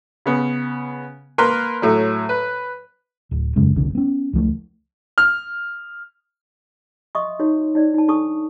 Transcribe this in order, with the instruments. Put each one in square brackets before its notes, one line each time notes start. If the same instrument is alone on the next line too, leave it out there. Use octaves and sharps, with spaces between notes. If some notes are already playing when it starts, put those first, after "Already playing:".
[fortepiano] C#3 B3
A#3 A#4 B4 C6
A2 F#3
B4
[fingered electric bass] D1
E1 F#2 C#3 G#3
F1 C2 F2 D3
B3 C#4
C#2 F3 A3
[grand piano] F6
[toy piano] D#5 E5 C6 C#6 D#6
D#4 F#4 C#5
D#4 C#5 D5
D#4 A5
D4 D#4 A4 A5 C#6 D#6